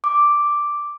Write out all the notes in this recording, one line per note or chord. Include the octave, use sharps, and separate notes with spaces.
D6